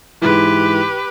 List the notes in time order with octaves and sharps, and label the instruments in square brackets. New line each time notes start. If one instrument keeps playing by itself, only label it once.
[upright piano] G#2 E3 [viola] G4 B4